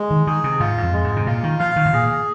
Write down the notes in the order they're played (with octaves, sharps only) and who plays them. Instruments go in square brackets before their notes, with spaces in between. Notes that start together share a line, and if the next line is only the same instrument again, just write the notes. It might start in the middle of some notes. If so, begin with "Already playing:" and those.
Already playing: [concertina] G#3
[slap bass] D#3
[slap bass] D#3 [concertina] G#4
[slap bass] C3
[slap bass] G#2 [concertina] F4
[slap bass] G#2
F2
[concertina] G#3
[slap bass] G#2
C3
[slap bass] A#2 [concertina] F4
[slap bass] D#3
[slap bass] F3 [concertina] F5
[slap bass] D#3
G#2
[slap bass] A#2 [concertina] G#4